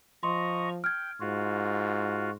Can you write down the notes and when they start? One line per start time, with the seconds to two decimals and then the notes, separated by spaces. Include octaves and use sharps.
0.23 F3 D#5 A#5 C6 C#6
0.84 G5 F6 G#6
1.21 G#2 F4 F#4